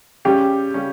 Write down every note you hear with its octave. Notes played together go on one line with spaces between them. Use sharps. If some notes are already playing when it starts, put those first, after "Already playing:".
C#3 G3 C#4 G4
C#3 G3 C#4